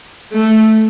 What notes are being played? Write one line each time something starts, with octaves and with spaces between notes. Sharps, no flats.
A3